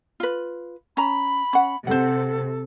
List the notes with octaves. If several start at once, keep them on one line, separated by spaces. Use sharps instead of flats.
F4 B4
C#4 A#5 B5
C#4 F#5
C3 A4 C5 F#5